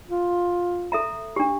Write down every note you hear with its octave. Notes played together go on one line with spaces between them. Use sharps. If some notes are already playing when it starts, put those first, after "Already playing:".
F4
A4 E5 A#5
D4 G4